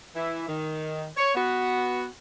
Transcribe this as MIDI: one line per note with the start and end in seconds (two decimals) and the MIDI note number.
0.15 0.46 52
0.15 0.46 64
0.48 1.06 51
1.17 1.32 73
1.35 2.06 59
1.35 2.06 66